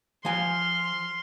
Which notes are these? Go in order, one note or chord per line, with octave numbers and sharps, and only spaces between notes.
F3 G#5 C6 F6